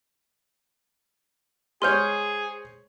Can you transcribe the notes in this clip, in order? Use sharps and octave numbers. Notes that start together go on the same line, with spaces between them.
G#3 G#4 C5 C#5 C6 F6 G6